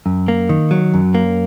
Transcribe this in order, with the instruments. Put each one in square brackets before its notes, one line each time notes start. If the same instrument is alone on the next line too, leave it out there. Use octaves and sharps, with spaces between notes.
[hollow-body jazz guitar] F#2
A#3
D#3
F#3
F#2
A#3